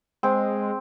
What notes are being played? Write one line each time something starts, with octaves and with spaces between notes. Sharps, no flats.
G#3 C4